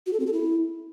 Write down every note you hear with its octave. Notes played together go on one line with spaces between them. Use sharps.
F#4
A4
C4
A4
E4